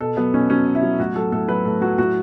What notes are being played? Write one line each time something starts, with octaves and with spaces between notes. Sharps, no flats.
B2 A4
F#3 B3
B2 C#4
F#3 C#4
B2
E4
F#3
A2 F#4
F#3 A4
A2 A4
F#3 B4
A2 A4
F#3 F#4
A2 F#4